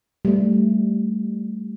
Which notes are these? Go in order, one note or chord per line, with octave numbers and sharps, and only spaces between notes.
G3 A3